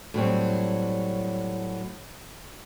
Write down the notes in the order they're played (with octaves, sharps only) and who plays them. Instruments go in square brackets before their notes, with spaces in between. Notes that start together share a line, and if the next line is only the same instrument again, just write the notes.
[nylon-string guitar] A2 F#3 G3 C4